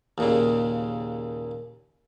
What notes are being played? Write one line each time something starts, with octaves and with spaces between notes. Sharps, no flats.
D#2 A#2 C#3